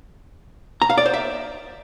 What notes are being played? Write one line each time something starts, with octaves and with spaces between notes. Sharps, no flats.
A#5
F5
D5
C5
E5